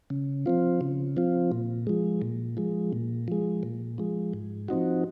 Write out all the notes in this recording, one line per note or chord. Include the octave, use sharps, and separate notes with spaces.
C#3
F3 C4 F4
C#3
F3 C4 F4
A#2
F3 G#3
A#2
F3 G#3
A#2
F3 G#3
A#2
F3 G#3
G#2
F3 C4 D#4 F#4